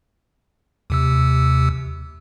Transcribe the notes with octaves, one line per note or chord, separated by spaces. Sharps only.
D#2 C3 E6